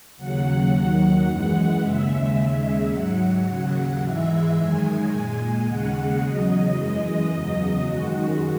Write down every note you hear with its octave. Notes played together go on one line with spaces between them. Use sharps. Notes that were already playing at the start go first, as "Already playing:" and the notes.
D#2 C#3 F#3 F#5
D#2 D#3 F#3
F#2 E3 G#3
D#2 C#3 G#3 E5
D#2 C#3 G#3
G#2 F#3 F#5
D#2 C#3 F#3
G#2 E3 G#3 E5
F#2 D#3 G#3 G#5
A#2 G#3
D#2 C#3 G#3 F#5
E2 C#3 F#3 D#5
F#2 E3 G#3
E2 C#3 F#3 D#5
F#2 D#3 G#3 F#4